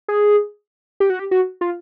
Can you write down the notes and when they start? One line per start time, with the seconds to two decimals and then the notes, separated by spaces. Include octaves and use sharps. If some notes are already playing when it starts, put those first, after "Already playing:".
0.08 G#4
1.00 G4
1.10 F#4
1.19 G4
1.31 F#4
1.61 F4